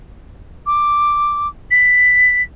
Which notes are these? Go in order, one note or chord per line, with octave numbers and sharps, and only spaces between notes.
D6
B6